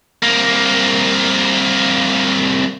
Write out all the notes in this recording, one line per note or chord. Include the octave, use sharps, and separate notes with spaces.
C2 A#3